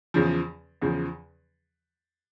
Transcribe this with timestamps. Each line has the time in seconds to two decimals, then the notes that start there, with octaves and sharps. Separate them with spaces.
0.14 E2 C#3 F3
0.81 E2 C#3 F3